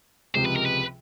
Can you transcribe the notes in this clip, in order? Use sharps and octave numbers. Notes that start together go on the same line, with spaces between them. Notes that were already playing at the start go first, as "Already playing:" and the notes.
C#2 C3 F3 G#3 C5
B4
A#4
B4